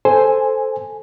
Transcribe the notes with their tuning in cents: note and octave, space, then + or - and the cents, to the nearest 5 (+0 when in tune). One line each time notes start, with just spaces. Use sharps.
A4 +0 C5 +0 G#5 -5